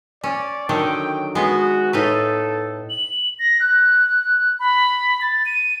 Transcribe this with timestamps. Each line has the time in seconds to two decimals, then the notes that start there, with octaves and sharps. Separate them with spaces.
0.24 C#4 D5
0.69 D3 D#3 F#3 G5
1.35 G#3 B3 F#4
1.93 A2 D#4 A4 B4
2.90 F#7
3.39 A#6
3.60 F#6
4.59 B5
5.21 A6
5.46 D#7